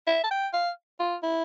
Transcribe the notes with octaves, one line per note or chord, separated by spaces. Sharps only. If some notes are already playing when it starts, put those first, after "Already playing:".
E5
A5
G5
F5
F4
E4